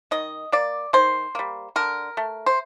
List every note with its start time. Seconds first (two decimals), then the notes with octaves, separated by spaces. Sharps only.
0.11 D#3 D#5
0.52 A#3 D5
0.93 D#3 C5
1.35 G3 A#3
1.76 D3 A#4
2.17 A3
2.46 C5